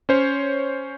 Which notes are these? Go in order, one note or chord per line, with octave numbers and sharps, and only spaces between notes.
C#4 C5 C#5